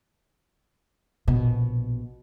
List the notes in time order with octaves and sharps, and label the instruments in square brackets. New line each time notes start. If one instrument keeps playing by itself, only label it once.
[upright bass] A#1 B2